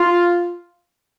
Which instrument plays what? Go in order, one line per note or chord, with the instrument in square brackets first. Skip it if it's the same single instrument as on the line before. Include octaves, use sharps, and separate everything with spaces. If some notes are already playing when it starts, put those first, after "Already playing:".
Already playing: [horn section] F4